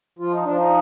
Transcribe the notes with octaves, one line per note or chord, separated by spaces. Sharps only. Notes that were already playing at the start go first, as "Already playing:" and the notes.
F3 F4
D#4
F3 D4
D#4